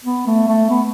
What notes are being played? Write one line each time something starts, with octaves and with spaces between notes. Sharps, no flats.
B3
A3
A3
B3